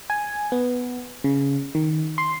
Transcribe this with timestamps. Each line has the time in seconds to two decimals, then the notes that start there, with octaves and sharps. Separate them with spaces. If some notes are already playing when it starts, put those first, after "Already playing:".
0.10 G#5
0.52 B3
1.24 C#3
1.75 D#3
2.18 C6